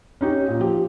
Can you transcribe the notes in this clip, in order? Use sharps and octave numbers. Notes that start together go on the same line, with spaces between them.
C#4 D#4 G4
A#2
F3 G4